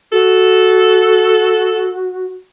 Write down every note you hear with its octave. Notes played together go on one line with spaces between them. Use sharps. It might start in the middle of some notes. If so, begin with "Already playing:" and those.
F#4 A4